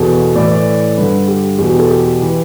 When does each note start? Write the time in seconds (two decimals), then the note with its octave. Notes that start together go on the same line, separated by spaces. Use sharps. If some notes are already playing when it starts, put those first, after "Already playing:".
Already playing: E2 B2 A4
0.35 A2 E3 D5
0.51 D5
0.97 G2 D3 B4
1.28 G4
1.59 E2 B2 G4
1.79 A4
1.88 G4
2.22 E3